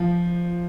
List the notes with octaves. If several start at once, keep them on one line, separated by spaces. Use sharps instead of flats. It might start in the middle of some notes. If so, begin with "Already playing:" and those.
Already playing: F3